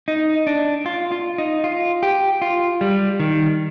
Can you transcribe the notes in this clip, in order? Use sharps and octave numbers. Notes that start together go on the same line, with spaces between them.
D#4
D4
F4
F4
D#4
F4
G4
F4
G3
D#3